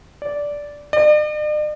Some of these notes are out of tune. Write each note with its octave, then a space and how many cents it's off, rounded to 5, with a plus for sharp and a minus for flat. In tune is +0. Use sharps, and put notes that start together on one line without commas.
D5 -10
D5 +45